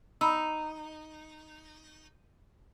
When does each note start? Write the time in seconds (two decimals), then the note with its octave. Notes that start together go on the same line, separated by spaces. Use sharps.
0.21 D#4 A#5 B5 E6